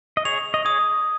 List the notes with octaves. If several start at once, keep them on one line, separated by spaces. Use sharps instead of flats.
D#5
G#4 C#5 F7
D#5
G#4 C#5 D#6